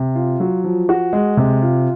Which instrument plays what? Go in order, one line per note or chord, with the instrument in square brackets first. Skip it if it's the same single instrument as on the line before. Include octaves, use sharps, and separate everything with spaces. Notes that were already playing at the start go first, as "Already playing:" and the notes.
Already playing: [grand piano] C3
F4
F#3
F3
F#4
G#3
C3
F4